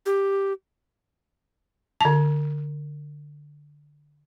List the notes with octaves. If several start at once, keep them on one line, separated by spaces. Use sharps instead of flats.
G4
D3 A5